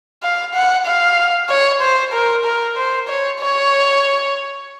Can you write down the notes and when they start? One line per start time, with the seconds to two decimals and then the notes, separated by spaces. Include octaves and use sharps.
0.22 F5
0.54 F#5
0.86 F5
1.49 C#5
1.81 C5
2.13 A#4
2.45 A#4
2.77 C5
3.08 C#5
3.40 C#5